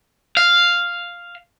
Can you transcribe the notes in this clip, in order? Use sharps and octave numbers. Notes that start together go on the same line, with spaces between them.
F5